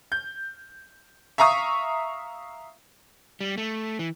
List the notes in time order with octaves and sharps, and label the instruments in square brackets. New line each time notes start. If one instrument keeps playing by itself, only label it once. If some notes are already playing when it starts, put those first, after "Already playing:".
[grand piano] G6
E5 F5 A#5 C#6 D#6
[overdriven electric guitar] G3
A3
E3